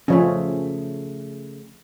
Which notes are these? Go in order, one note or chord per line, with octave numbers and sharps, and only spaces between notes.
C#3 F3 A3 C#4